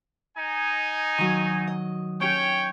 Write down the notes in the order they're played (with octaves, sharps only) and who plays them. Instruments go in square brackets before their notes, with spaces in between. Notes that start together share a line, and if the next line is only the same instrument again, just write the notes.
[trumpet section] D#4 G#5
[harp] D#3 F#3
D#5
[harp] C#4 G4 [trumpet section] C#5 G5